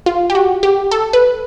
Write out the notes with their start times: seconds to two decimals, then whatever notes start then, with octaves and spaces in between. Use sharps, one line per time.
0.06 F4
0.30 G4
0.35 F#4
0.63 G4
0.91 A4
1.13 B4